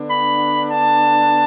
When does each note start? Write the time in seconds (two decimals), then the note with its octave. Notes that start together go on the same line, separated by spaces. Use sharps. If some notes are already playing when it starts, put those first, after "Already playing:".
Already playing: D3 B3 D4
0.10 B5
0.70 A5